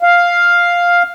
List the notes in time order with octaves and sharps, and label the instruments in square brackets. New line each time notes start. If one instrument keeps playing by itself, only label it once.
[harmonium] F5